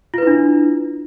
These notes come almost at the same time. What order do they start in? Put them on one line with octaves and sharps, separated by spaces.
F4 B4 E4 D4